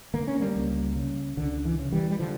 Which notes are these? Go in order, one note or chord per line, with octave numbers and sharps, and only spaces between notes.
D3 A#3
C#4
G3 A#3
C#2
C#3
C#2 D3
E3
C#3
E3 G3
G3
D3 F3